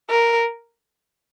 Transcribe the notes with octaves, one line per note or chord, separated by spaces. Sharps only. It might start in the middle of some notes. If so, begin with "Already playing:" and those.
A#4